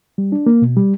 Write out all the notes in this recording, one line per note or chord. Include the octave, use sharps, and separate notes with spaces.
G3
D4
A#3
B2
G3